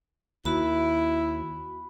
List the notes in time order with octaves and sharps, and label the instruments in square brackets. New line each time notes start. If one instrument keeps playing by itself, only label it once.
[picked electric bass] D#2 [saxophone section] E4 [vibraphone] F#4 B5